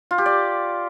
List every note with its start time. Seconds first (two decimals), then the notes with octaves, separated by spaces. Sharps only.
0.11 F4
0.18 G4
0.26 D5